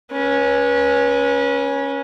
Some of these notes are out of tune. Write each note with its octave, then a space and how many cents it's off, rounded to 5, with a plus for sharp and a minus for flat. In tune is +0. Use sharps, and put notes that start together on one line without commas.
C#4 +0 B4 -35